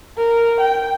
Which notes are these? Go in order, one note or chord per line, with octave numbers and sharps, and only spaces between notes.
A#4
G5